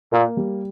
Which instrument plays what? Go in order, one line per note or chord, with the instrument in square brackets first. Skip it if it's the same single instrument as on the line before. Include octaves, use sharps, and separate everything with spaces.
[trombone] A#2 [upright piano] A#3
[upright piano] G3